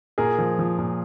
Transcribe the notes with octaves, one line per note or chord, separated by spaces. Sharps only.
A#2 G#4 A#4
F3
F3
A#2